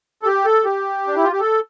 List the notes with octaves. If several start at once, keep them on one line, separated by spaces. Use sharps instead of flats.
A4
G4
A4
G4
D4
E4
F4
G4
A4